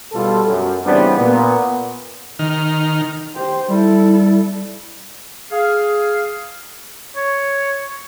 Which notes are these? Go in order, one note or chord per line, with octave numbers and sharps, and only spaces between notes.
B2 G3 F4 A4
F#2
C#3 E3 G3 B3 C4 D4
A#2 B3
D#3 F6
G4 C5
G3 E4 A4
G#4 F5
C#5